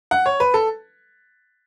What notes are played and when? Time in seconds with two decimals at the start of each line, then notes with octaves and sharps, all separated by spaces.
0.11 F#5
0.26 C#5
0.40 B4
0.54 A4